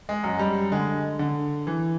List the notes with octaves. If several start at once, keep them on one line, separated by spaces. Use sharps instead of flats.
G#3
F#2
G3
D3 G#3
D3
E3